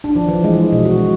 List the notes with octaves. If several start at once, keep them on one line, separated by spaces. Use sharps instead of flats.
D4
F3
E3
G#3
B2
F#4
G#3